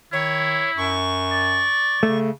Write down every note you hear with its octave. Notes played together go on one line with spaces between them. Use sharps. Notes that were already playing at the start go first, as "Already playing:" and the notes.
D#3 E4 C#5
F#2 C#6
D5
C#3 A3